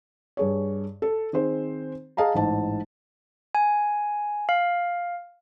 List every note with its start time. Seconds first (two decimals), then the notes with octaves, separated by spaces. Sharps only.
0.37 G2 G#4 C#5
1.02 A4
1.33 D#3 C4 G#4 C5
2.17 G#4 D#5 F5 A5 A#5
2.34 A1 G#2 A5
3.55 G#5
4.49 F5